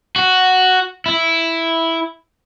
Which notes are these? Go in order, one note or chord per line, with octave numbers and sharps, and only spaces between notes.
F#4
E4